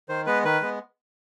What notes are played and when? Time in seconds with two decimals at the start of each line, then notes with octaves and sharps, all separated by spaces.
0.09 D#3 C5
0.26 G#3 B3 B4
0.44 D#3 B4
0.61 G#3 B3